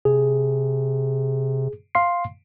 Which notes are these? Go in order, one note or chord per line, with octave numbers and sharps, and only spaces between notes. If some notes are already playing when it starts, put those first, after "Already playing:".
C3 G#4
F5 C6 C7